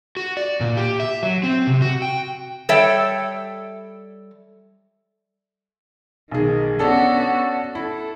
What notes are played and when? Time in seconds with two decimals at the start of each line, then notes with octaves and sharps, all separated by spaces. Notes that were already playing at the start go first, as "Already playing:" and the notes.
0.17 F#4
0.37 D5
0.61 A#2
0.77 G4
1.00 E5
1.23 F#3
1.43 C4
1.67 C3
1.82 F#4
2.02 G5
2.69 G3 A4 C#5 E5 G5
6.31 B1 D#3 G#4
6.79 B3 C#4 D4 F#4 A4
7.75 E4 A4